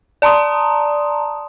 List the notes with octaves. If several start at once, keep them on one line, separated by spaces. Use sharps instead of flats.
D5 A5 A#5 C6 D#6